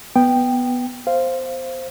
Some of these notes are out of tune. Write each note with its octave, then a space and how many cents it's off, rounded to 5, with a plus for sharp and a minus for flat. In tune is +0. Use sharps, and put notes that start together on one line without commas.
B3 +0 G5 +0
C5 +0 F5 -10